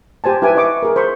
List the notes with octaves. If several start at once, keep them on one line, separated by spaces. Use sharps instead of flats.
G4 C5 G#5 A5
E4 G4 B4 G#5 D6
E4 B4 D#5 C#6 D6
G#4 A#4
C5 B5 C#6